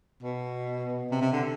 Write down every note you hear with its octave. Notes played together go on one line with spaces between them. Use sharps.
B2
C3
C3
D3